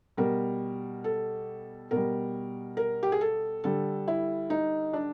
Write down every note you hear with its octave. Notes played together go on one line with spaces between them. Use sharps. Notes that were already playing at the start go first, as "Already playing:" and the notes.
B2 G3 A#4
A4
B2 G3 A#4
A#4
G4
G#4
A4
D3 G3 A4
E4
D#4
D4